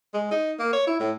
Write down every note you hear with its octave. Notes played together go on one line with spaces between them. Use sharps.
G#3
D#4
A#3
C#5
E4
A2